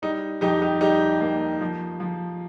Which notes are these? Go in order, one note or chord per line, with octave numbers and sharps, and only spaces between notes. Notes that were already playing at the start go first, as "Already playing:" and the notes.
G3 D#4
F2 D#4 G4
D#4 G4
G3 D#4 G4
A#3
F3
F3